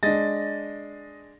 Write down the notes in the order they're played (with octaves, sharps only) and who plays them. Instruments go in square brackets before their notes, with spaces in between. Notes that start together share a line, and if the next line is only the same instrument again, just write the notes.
[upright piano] G#3 D4 [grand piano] D#5 A6 A#6